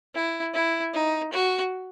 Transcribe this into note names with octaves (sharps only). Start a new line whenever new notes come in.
E4
E4
D#4
F#4